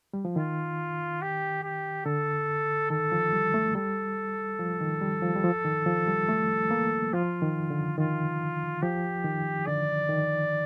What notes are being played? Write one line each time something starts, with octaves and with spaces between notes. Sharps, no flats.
G3
F3
D#3 F4
G4
G4
D3 A4
D#3 A4
F3
G3
A3
G3 A4
F3
D#3
G3
F3
G3
F3
D#3
F3
G3
A3
A#3
F3 F4
D#3
D3
D#3 F4
F3 G4
D#3
D3 D5
D#3